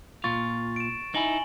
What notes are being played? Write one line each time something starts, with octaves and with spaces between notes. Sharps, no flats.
A#2 F4 C#6 A6
D7 E7
D#4 E4 G#5 F#7 G7